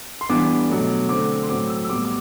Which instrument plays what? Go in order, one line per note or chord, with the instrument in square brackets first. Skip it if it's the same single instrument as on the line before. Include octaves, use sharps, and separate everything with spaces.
[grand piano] C6
E3 G3 B3 D4 D6
B2 F#3 A3
D3 A3 C4 D6
C6
A2 F#3 C4 D6
E6
E6
A2 G3 B3 D6
D6